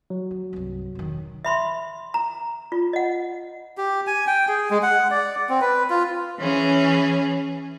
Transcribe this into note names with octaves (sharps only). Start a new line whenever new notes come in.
F#3
F3
C2 G2
E1 D#3
E5 B5 C6
A#5
F4
D#5 F#5
G4
G#5
G5
G#4
G#3
F#5
D5
C4
B4
F4
E3 C#4 G#4